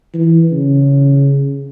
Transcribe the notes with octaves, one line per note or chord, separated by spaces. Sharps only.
E3
C#3